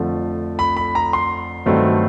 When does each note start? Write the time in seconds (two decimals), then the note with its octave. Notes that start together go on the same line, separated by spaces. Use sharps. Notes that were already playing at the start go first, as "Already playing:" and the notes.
Already playing: F2 D3 F3 A3
0.59 B5
0.77 B5
0.95 A#5
1.13 C6
1.66 G2 D#3 F#3 A3 C4